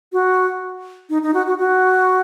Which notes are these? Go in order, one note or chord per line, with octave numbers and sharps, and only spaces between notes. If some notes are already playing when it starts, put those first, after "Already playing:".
F#4
D#4
D#4
F#4
F#4
F#4